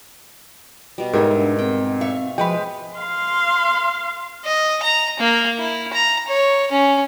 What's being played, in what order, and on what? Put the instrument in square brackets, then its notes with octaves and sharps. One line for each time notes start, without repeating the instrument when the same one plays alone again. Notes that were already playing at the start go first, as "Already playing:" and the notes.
[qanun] B2 G3
[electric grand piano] G#2 G4 [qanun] E4 C#5 [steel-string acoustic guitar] A#4 D#5
[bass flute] D4
[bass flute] C4 [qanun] G5
[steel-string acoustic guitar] E5 F5 [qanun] C#6
[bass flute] F3 [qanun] G#3 B4 F5 [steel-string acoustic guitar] F#4 [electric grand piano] G5 B5
[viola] F5 C6
[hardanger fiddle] D#5
A#5
A#3
E4
A#5
C#5
C#4